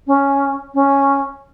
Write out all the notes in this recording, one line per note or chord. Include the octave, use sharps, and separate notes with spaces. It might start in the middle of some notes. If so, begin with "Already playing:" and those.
C#4
C#4